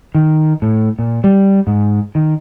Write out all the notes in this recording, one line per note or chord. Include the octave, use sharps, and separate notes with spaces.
D#3
A2
A#2
G3
G#2
D#3